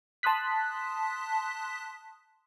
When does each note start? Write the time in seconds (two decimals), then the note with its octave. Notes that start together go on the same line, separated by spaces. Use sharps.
0.23 A5 C6 D#6 F#6 B6